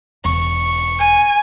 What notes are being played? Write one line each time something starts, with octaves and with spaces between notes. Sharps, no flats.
E1 C#6
G#5